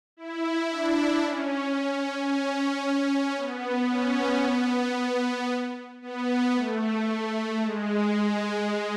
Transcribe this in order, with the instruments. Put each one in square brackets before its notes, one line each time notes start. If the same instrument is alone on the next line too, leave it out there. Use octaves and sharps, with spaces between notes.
[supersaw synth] E4
D4
C#4
C#4
B3
C#4
B3
B3
A3
G#3